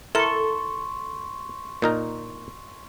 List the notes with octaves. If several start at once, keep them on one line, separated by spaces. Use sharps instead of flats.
E4 A4 A#4 C6 C#6
A#2 D#4 A#4